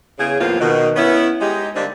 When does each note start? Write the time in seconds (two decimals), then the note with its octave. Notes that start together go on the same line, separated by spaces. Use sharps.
0.18 E2 C#3 G#4
0.40 D#2 A2 F3 A#3 B3 F4
0.60 B2 D#3
0.96 B3 C#4 E4
1.41 G#3 D#4 G4
1.75 D3 G3 A#3 C4 D4 D#4